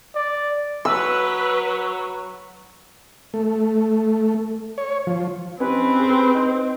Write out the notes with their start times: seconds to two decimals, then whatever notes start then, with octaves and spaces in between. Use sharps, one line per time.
0.15 D5
0.85 F#3 B4 E6
3.34 A3
4.78 C#5
5.07 F3
5.60 C4 C#4 D#4 G4 B4
6.00 G#4
6.35 D#4 C5